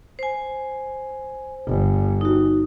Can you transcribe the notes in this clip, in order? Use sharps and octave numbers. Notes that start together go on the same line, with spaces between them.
C5 G#5
G1
D#4 F#4